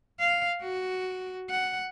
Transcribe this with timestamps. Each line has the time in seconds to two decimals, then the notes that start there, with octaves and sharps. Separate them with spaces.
0.20 F5
0.61 F#4
1.50 F#5